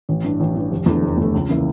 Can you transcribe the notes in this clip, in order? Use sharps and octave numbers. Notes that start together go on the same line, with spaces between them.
A1
G2 E3
A1
G2 E3
F1
E2 D3 A3
F1
E2 D3 A3
C#2
C#3 E3 A#3 E4